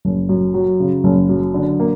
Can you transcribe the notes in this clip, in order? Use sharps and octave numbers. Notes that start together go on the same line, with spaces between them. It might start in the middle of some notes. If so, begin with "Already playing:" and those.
F#1
F#2
F#3
C#3
F#1
F#2
D3
A#3